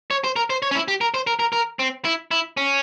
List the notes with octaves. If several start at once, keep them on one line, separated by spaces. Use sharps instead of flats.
C#5
C5
A#4
C5
C#5
C#4
E4
G4
A#4
C5
A#4
A#4
A#4
C4
E4
E4
C#4